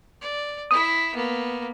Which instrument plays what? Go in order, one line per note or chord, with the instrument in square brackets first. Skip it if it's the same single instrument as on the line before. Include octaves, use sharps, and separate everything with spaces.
[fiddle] D5
[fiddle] E4 E5 [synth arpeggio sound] D#6
[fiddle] A#3 B3